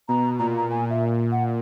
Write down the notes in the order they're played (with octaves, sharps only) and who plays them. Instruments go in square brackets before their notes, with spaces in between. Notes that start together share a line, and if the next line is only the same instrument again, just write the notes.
[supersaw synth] B2 [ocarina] A#5
[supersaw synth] A#2 [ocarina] A#5
[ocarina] A#5
[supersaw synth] A#2 [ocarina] G#5
[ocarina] E5
F#5